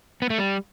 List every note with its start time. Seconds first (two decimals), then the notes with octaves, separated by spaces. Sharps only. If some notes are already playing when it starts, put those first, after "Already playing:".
0.22 B3
0.30 A3
0.38 G3